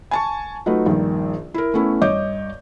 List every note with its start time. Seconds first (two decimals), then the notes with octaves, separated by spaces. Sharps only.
0.11 G#5 A5 C#6
0.66 F#3 A3 D#4 F4 B4
0.86 A#1 G2 D#3
1.54 E4 A#4
1.74 A3 B3 C#4 E4
2.01 G2 C#5 D#5 D6 G6